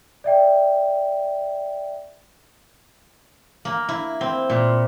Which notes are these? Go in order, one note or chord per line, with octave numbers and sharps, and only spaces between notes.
D5 E5 G5
A#3
E4
C4
A#2